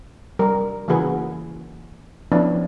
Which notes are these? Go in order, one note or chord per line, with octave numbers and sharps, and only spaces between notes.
G3 A#4
C#3 E3 A#3 F#4 G#4 B4
F3 B3 C#4 D4 E4